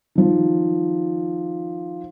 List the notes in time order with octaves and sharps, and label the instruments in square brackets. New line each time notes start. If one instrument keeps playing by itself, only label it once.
[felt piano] D#3 F3